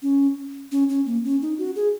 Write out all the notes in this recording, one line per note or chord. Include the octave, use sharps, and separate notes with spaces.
C#4
C#4
C#4
A#3
C#4
D#4
F#4
G#4